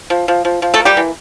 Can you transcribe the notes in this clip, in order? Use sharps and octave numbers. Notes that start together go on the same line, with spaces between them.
F3
F3
F3
F3
A3 A4
A#3
G3 G4
E3